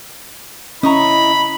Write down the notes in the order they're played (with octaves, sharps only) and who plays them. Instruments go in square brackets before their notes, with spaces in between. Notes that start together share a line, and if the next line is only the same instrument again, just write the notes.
[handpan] C#4 [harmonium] E4 D#5 [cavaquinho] A#5 C#6 D#6 [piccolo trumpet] B5